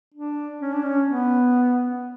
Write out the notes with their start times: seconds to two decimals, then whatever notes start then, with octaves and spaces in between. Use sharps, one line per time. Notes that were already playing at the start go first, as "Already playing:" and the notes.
0.14 D4
0.62 C#4
0.73 D4
0.84 C#4
1.09 B3